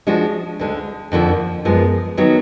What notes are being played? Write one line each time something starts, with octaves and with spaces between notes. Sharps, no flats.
F3 G#3 D4 F#4
D2 D3 G#3
F2 D3 F3 A#3
F#2 F3 G#3 B3
D#3 F#3 B3